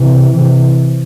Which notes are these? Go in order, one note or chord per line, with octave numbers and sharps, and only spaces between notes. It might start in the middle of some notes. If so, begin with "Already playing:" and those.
Already playing: C3 E3
C3 E3